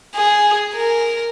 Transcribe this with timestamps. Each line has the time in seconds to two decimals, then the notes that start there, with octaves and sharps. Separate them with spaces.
0.16 G#4
0.75 A#4